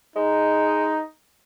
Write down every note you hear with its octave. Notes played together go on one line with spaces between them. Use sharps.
G#3 D#4